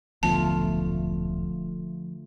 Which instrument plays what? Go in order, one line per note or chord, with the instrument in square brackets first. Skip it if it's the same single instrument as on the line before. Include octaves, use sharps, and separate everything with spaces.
[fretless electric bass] D#1 B1 B3 [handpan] D3 A3 F4 [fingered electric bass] F3 [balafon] A5